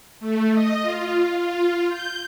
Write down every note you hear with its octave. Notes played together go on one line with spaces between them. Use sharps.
A3
D#5
F4
F4
G6